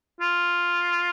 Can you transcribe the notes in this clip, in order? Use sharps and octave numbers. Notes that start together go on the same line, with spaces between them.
F4